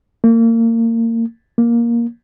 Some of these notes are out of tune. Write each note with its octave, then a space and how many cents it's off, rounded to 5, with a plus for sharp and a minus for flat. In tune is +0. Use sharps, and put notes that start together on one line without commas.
A#3 -30
A#3 +10